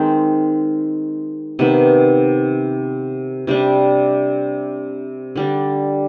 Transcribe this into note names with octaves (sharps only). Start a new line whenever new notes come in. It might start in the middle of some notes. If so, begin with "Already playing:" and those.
Already playing: D#3 G#3 C4
C3 D#3 B3
C3 G3 D4
D3 G3 D4